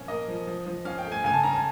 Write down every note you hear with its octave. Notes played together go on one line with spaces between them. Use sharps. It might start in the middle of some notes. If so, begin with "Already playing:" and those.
Already playing: A#2 F3 C#4
A#3 D#5
F3
F3
F3
C#4 F5
G5
A3
G#5
C#3 G#5
A5
C#4 A#5
A5